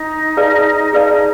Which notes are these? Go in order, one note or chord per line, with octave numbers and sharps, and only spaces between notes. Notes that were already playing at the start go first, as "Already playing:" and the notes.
Already playing: D#4
G#4 B4 D5 F5 A5
G#4 B4 D5 F5 A5